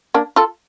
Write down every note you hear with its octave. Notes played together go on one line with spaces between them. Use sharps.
A#3 D4
F4 A4